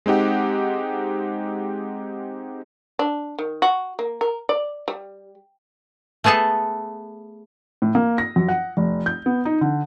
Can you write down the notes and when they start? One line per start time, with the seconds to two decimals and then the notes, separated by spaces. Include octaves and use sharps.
0.06 G#3 C4 D#4 G4 F#5
2.99 D4
3.39 D#3
3.62 F#4
3.99 A#3
4.21 A#4
4.49 D5
4.88 G3
6.24 A3 B3 G#4 A4 A5
7.82 A2
7.95 A#3
8.18 A#6
8.36 F#2
8.48 F#5
8.77 F1
9.06 G6
9.26 B3
9.45 D#4
9.61 D3